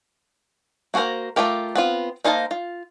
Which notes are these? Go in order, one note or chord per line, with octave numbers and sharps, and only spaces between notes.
A#3 F#4 A4 A#4 C5
A3 A#3 F4 G4 A#4
B3 C4 F4
A#3 D#4 C5 F5 A5
F4